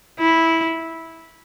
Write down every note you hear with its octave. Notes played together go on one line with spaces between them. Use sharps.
E4